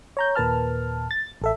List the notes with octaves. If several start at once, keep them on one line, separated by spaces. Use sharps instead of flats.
C#5 A#5 G6
D#2 A#2 A#4 B4 A5 F6
A6
A1 A4 E5